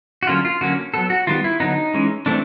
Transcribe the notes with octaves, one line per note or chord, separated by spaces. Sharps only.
F#4
D3 F#3 A#3 C#4 F4
F4
D3 F#3 A#3 C#4 F#4
F#3 B3 A4
F#4
D#3 G3 B3 F4
E4
D3 F#3 B3 D#4
E3 G#3 C#4
E3 A3 C4 D4